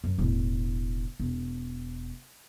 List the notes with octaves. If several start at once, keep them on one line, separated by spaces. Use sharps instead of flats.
F#2 F#3
E1 A2
E1